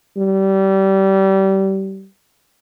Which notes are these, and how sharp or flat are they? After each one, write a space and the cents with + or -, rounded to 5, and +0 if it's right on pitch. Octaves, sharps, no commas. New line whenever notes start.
G3 -25